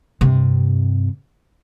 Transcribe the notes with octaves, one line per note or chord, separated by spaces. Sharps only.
G2 C3